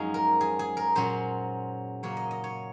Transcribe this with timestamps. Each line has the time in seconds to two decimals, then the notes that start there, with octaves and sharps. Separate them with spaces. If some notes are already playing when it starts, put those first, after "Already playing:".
Already playing: F#2 F3 G#3 C#4 D#4 G#4
0.14 A#4
0.41 G#4
0.59 G#4
0.77 A#4
0.95 A#2 F#3 C#4 C5
2.03 C#3 F#3 A#3 C#5
2.17 D#5
2.31 D#5
2.44 C#5